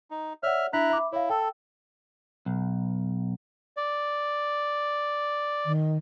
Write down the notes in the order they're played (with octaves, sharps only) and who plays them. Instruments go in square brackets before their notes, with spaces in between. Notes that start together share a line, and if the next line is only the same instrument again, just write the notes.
[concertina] D#4
[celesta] C#5 D5 F#5 [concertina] E5 F6
[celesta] D4 E5 B6 [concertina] E4 A#5 F#6
[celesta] E5 B5 D6
[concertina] E4 [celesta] C#5 F5
[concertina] A4 [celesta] G5 E6
[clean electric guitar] B1
[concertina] D5
[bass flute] D#3